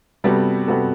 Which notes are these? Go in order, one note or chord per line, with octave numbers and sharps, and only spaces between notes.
C3 G3 B3 F#4 A4
C3 G3 B3 F#4 A4